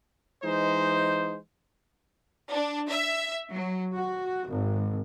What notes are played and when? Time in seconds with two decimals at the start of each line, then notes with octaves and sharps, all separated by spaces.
0.43 E3 G#3 D#4 C5
2.51 D4
2.88 E5
3.51 F#3
3.95 F#4
4.48 G#1